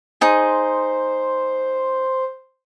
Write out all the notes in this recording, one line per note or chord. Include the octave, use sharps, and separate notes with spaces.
D#4 G#4 C5